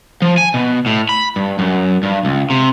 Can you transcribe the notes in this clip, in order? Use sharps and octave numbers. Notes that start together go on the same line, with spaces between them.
F3
G#5
B2
A2
B5
G2
F#2
G2
C#2
C3